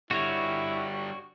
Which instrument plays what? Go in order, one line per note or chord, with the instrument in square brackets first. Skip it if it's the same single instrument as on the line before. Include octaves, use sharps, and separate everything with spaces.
[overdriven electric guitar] D3 G3 [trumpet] E4 [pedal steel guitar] F#4 C#5